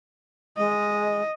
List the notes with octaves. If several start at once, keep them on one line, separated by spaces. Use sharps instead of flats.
G#3 D#5